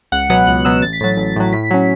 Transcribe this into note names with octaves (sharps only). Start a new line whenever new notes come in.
C#2 F#5
B2 F#3 B3 F#5
C#2 F#6
B2 F#3 B3 E6
A1 A6
B6
A2 F#3 A6
A1
A2 F#3
A2 B6
F#3 C#4